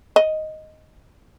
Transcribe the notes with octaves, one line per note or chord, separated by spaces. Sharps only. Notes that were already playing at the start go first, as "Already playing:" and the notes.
D#5